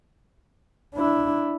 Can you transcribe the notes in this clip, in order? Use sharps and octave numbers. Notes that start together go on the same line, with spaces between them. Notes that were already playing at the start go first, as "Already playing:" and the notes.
D4 E4